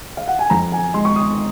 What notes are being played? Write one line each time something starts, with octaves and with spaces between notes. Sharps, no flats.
F5
F#5
G#5
F2 A#5
G#5
G#3 C6
C#6
D#6